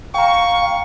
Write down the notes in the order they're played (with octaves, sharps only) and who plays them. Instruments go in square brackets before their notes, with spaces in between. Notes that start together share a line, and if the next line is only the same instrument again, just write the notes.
[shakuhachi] F5 [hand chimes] G5 A#5 [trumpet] C#6